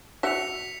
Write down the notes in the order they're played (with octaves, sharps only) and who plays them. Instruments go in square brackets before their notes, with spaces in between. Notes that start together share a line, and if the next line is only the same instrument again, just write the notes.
[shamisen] F#4 D5 E5 [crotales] B6 C#7 F7